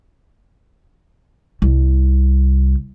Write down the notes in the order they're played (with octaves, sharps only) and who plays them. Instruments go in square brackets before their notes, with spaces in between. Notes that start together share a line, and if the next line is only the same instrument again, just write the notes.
[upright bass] C2